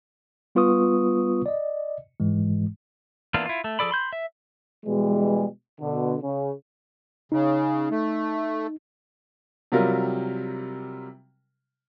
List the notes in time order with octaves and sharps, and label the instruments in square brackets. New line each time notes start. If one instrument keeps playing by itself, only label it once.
[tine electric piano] G3 B3 F4 B4 C#6 D#6
D5 D#5
G#2 E3 G#3
[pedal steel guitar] E3 A#3 B3 D4 F4
E4 F4
A3
F3 G#4 A4 D5 B5
B5 C6 G6
E5
[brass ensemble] B2 E3 G3 G#3
B2 D3
C#3
[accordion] C#3 [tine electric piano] D#4
[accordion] A3
[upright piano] C3 F#3 G3 F4 A#4